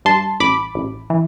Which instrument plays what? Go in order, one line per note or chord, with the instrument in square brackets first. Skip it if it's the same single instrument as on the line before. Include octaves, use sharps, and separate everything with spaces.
[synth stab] G2 A5 C6
A1 B5 D6
A1
E3